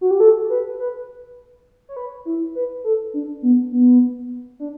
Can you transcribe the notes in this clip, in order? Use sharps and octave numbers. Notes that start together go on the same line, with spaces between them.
F#4
G4
A4
B4
B4
C#5
B4
E4
B4
A4
D4
B3
B3
D4